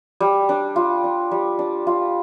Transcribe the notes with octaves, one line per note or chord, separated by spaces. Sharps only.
G3
D4
F4
D4
G3
D4
F4